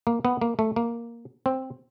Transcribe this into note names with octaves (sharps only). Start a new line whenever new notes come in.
A#3
B3
A#3
A3
A#3
C4